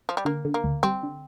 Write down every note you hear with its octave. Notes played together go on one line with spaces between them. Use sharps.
F3
G3
D3 A#3
D3
A#3
D2
G3 C4
D3